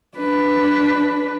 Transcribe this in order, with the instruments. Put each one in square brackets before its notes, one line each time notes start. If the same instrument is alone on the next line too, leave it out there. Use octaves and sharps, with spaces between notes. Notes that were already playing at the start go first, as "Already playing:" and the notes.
[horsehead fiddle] D4 B4